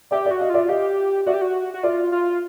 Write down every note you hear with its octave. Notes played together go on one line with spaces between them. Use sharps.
G4 D5 E5
D5 E5
F#4
D#5 F5
F4 D5 E5
G4 D#5 F5
F#4 D5 E5
G4
F#4
F#4
F4 D5 E5
F4